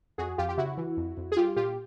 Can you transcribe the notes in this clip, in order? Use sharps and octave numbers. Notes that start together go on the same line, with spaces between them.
F2 F#4 G#4
F2 F4 G4
G4
C#3 E4 F#4
E3
F2
F2
G#4
G3 F4 G4
A#2 F4 G4